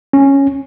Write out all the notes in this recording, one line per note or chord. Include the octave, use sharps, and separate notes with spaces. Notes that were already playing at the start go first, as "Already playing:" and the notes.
C#4